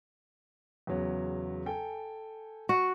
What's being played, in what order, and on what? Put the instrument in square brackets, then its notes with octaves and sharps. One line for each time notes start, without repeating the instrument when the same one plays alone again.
[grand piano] E2 C#3 F#3
A4 G5 G#5
[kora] F#4